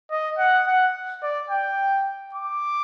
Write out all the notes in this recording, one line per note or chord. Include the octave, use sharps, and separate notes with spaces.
D#5
F#5
F#5
D5
G5
D6